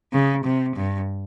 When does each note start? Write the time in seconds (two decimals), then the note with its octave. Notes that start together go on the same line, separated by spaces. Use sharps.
0.13 C#3
0.44 C3
0.76 G2